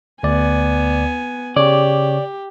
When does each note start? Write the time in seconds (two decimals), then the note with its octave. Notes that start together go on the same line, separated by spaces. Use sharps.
0.23 D2 B3 D5 G#5
1.56 C#3 G4 C#5 D5